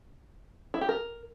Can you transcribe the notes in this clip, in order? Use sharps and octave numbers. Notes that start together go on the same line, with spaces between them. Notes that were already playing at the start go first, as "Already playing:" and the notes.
E4
G4
A#4